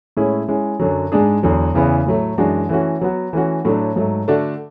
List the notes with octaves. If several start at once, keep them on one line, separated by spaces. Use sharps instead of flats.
A2 G#3 C#4 E4 G#4
G#3 C#4 E4
F#2 D3 F#3
G#2 G#3 D4 G#4
E2 D3 F#3
E2 C#3 E3 B3
A2 F#3 A3
F#2 E3 G#3 D4 F#4
E3 A3 C#4 F#4
F#3 B3 F#4
E3 A3 C#4 F#4
A2 F#3 A3 D4
G#2 F#3 A3
D3 A3 D4 F#4